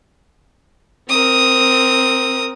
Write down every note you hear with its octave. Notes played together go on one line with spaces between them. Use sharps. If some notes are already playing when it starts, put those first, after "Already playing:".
C4 A#4 D#6